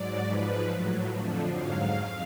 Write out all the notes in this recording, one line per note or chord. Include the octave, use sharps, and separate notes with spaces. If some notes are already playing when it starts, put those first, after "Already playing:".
Already playing: G#2 F#3 D5
G#2 F3 B4
A2 F#3
F2 D3 F3
G#2 F#3 F5
F2 F5